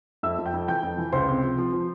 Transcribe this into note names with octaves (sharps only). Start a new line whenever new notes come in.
F2 E5 E6
F2
G5 G6
F2
E3 G5 G6
F2
E3
C#2 C5 C6
C3
F3
F3
F3